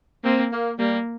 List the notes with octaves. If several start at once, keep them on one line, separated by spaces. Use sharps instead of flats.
A#3 C4
A#3
G3 A#3